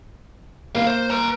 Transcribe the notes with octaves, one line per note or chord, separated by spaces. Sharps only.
A#3 E4 F5
C5
B4 A#5